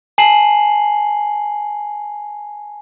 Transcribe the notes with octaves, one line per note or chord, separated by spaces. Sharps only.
G#5 A5 C7 F#7